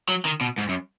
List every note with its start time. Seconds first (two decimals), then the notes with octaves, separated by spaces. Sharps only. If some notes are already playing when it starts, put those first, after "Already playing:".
0.08 F#3
0.25 D#3
0.41 B2
0.58 G#2
0.69 F#2